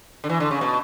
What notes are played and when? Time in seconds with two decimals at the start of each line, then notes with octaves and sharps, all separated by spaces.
0.24 D3
0.30 E3
0.40 D3
0.51 C#3
0.61 B2